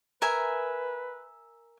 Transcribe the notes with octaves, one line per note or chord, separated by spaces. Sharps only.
A#4 B4 E5 G#5